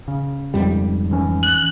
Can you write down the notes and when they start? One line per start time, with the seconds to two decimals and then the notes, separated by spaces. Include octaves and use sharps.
0.08 C#3
0.54 F2 G#2 G3
1.11 E3 C#4
1.43 F#6